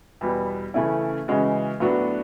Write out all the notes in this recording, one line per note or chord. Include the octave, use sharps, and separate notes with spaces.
E2 B2 G3 B3
C#3 E3 A3 C#4 E4
C#3 E3 G#3 C#4 F#4
A2 F#3 B3 D4 F#4